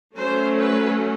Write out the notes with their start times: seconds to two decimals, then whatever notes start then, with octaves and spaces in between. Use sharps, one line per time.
0.17 F#3 A3 C#4 C5
0.57 B4